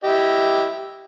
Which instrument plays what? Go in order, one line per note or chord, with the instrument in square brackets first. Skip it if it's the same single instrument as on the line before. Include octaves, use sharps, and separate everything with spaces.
[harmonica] E4 G4 D#5